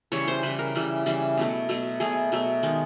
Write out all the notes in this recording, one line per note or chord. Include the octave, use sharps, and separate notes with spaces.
C#3 E3 G3 C#5
C5
C#3 E3 G3 B4
A#4
C#3 E3 G3
C#3 E3 G3
B2 F#3 A3
B2 F#3 A3
B2 F#3 A3 G#4
B2 F#3 A3
D#3 G#3 B3